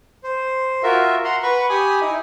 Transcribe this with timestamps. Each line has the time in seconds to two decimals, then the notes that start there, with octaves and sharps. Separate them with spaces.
0.24 C5
0.83 F4 F#4 A#4 E5
1.24 F#5 A#5 C6
1.43 B4 F#5 B5 C#6
1.70 G4 G#5 B5 D#6
2.01 D#4 E4